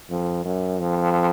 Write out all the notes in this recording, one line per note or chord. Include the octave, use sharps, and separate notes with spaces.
F2
F#2
F2